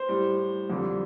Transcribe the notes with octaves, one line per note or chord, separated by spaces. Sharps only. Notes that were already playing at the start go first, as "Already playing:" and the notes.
Already playing: C5
A2 G3
F2 D3 G3